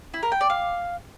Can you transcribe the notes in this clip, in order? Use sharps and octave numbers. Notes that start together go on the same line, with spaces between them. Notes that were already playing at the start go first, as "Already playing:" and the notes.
E4
A#4
G5
D5
F5